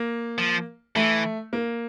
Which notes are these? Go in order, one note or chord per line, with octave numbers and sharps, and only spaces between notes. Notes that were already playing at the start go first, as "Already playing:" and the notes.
Already playing: A#3
F3
E3 A3
A#3